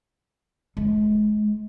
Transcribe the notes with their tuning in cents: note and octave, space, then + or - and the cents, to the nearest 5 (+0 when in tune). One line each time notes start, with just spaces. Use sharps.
G#3 +30